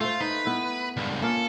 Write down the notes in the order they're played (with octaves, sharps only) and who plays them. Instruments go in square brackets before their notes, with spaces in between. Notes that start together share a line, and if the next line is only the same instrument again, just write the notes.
[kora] A3 C5 [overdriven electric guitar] F4
[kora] D#4 [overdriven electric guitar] B4
[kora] B3 E4
[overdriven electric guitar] C#2 G2
[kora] A#3 C#4 F4 [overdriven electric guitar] A4